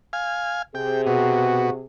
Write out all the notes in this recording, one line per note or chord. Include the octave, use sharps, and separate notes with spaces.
F5 G#5
C3 G#4 G5
B2 F#4